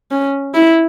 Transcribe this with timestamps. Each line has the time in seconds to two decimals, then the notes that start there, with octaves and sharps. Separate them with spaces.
0.11 C#4
0.54 E4